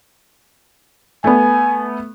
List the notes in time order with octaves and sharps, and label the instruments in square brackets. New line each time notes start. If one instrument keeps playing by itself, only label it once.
[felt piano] A3 B3 [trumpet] G#5